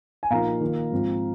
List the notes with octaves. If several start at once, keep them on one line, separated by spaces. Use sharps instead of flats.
G#5
A#2 F3 A#3 D#4 F5 A#5
D#3 A#3 F4
G#2 F3 C4 F4